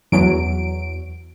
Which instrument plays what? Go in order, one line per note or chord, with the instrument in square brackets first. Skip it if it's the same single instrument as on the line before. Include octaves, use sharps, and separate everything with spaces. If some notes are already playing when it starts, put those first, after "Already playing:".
[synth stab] E2 F#3 D7